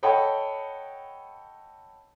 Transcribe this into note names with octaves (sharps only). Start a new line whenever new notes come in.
A4 C#5 D#5 F#5 G5 B5